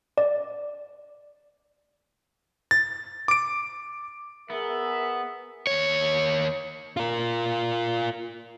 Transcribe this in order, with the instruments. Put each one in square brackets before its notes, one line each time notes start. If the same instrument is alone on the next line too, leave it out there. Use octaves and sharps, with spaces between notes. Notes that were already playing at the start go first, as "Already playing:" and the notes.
[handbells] D5
[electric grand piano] A6
D6 D7
[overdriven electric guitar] B3 [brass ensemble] G#4 A#4 E5
[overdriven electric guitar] D#2 C#5
[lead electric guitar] F4 A#4